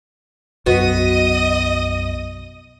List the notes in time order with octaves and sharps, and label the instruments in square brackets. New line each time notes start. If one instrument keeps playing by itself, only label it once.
[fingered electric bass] B1 F#2 [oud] B3 F#4 [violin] D#5 D#6